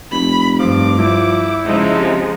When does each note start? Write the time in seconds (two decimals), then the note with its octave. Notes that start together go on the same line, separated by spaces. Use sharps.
0.11 F1 B5
0.59 G2 F3 D6
0.98 F3 E4
1.66 G#2 C#3 F3 G#3 D#4
1.96 C3